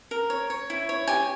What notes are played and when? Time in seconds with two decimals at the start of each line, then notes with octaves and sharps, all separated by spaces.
0.11 A#4
0.30 C#5
0.50 C#5
0.70 E4
0.89 C#5
1.08 G4 G#5